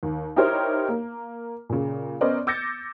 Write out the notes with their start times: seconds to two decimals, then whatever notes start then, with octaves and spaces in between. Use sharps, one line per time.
0.03 D#2
0.36 D#4 E4 G4 A#4 C5 C#5
0.89 A#3
1.70 A#2 C#3
2.21 B3 C#4 A#4 C5 D5 D#5
2.47 D6 E6 G6 A6 A#6 C#7